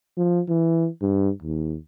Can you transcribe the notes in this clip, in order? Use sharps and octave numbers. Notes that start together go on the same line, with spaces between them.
F3
E3
G2
D#2